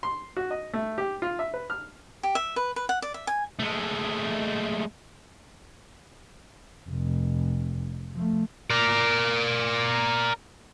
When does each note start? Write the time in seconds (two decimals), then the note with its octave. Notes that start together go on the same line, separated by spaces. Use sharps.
0.03 C6
0.37 F#4
0.51 D#5
0.73 A3
0.98 G4
1.22 F4
1.39 E5
1.54 B4
1.70 F6
2.23 G4
2.35 E5
2.56 B4
2.76 B4
2.89 F#5
3.02 D5
3.14 E5
3.27 G#5
3.59 G#3 A3
6.89 F1
8.14 F3 A3
8.71 A#4 D5